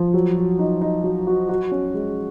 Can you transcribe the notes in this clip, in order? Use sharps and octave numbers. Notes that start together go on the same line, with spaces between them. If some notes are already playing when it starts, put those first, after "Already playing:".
Already playing: F3
F#3
F#4
D#4
D#4
F#3
F#4
F#4
C#4
G#3